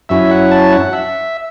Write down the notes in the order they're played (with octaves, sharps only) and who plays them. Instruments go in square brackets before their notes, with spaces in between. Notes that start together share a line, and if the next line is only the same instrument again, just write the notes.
[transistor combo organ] F#2 F#3 C#4 E4 E5
F#5
A5
F#5
E5